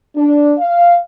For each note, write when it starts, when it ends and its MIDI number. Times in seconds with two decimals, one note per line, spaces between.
0.15 0.53 62
0.58 0.98 77